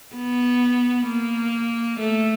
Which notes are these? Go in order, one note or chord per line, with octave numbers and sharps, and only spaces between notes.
B3
A#3
A3